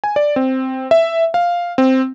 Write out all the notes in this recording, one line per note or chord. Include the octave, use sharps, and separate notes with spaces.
G#5
D5
C4
E5
F5
C4